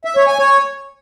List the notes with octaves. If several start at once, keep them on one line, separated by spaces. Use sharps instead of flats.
E5
C#5
G#5
C#5